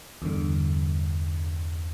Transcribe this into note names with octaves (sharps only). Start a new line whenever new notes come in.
E2 G2 D3